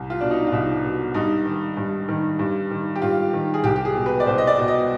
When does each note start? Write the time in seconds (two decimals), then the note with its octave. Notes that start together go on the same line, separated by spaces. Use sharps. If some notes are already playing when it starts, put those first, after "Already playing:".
Already playing: C2
0.10 F4
0.21 B2 D4
0.31 D#4
0.47 F4
0.52 C2 D#4
0.83 B2
1.14 G2 D#4
1.46 D#3
1.77 G2
2.09 D#3
2.39 G2
2.71 D#3
2.96 G4
3.02 G2 F4
3.33 D#3
3.54 G#4
3.64 C2 G4
3.76 G4
3.85 G#4
3.95 B2
4.06 B4
4.20 D5
4.26 C2 C5
4.38 D#5
4.47 D5
4.58 B2
4.68 D#5